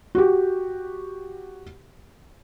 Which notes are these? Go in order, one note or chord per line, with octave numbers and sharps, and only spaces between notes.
F#4 G4